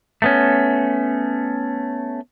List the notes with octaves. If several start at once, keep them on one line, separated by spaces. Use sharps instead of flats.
A3 B3 C#4